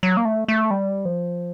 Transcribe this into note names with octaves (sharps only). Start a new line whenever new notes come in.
F#3
A#3
A3
A3
G3
F3